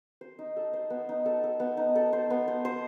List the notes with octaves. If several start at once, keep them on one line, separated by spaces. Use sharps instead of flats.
C5
D#4
A4
C5
B3
D#4
A4
A4
B3
D#4
A4
C5
B3
C5
C5